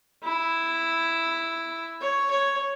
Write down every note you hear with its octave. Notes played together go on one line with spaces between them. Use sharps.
E4
C#5
C#5